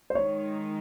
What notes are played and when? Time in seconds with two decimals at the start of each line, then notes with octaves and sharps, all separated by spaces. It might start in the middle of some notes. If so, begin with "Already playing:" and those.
0.10 C5
0.15 D#3 G#3 D#4 C#5